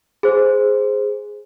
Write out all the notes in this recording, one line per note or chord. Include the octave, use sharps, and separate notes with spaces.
G#4 C5